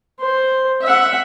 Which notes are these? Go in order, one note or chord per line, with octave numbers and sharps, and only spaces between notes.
C5
E5 F#5